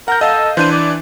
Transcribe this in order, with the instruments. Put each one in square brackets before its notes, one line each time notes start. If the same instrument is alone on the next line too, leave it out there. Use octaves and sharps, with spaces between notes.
[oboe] A#4 [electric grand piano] F#5 G6
[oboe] A4 [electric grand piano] D#5 F5
[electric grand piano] E3 D4 D#7 [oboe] C5
[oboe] D5